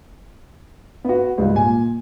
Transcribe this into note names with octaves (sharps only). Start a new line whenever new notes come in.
B3 F#4
C#2 G#2 G3
A#2 G#5